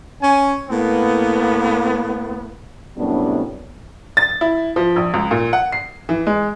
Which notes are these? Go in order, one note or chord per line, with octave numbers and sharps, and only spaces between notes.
C#4 G#5
A2 A#3 B3
F#2 A2 C3 G3 B3 D4
A6
E4
F3
A#1
C#2
A#2
F#5
C7
E3
G#3